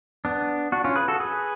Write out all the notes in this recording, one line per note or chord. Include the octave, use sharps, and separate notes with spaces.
B3 D4
D4 F#4
C#4 F4
G#4 B4
F#4 A4
G#4 B4